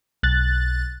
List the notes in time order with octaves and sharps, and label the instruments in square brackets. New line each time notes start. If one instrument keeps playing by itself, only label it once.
[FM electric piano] B1 F#6 A6